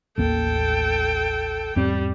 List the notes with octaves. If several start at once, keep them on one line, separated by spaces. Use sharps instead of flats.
A1 D#2 A#3 A4 G5
E2 G#2 G3 C4